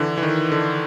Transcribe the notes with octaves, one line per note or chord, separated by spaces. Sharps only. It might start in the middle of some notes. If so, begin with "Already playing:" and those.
Already playing: D3 E3
E3
D#3
D3